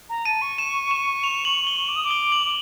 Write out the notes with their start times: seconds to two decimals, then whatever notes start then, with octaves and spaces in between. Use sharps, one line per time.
0.09 A#5
0.25 A5 D#7
0.41 C#6
0.58 E7
0.91 E7
1.24 F7
1.45 F#7
1.67 G7
1.88 D6
1.96 D#6
2.04 D6
2.11 G7
2.32 F#7